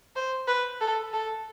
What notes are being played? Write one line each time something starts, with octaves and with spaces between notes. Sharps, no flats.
C5
B4
A4
A4